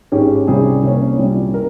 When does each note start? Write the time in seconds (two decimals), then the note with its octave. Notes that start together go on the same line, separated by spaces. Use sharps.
0.12 G#1 G#2 D#3 G#3 C#4 G4
0.47 C2 C3 G3 C#4 G#4
0.83 C2 C3 D#3 A#3 C#4
1.18 C2 A#2 G3 C#4
1.54 A#4